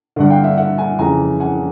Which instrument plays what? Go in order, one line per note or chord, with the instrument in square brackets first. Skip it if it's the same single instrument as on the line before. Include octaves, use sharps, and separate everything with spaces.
[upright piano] G2 D3 F#5
F5 G5
E5 F#5
E5 F#5
F#5 G#5
F2 C#3 E3 G#5 A#5
F#5 G#5